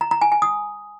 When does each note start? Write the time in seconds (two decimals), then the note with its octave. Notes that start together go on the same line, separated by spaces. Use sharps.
0.01 A#5
0.11 A#5
0.21 G#5
0.32 G#5
0.42 D#6